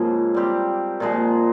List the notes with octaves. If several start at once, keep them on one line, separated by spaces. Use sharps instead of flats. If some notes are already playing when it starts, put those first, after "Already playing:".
Already playing: G#2 C#3 F3 A#3 C4 F4
G3 C4 G4
A#2 F3 G#3